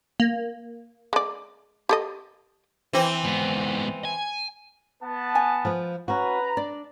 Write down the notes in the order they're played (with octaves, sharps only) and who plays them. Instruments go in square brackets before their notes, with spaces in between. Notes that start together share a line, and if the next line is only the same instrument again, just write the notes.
[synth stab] A#3
[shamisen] G#3 D5
G4 A4 D#5
[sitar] E3 C4
[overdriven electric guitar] G#2 B3
G#5
[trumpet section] B3 A5
[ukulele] G#5
[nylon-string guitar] F3 F4 B4
[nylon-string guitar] C#4 F#4 [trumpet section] B4 A#5
[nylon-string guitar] D4 [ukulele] D5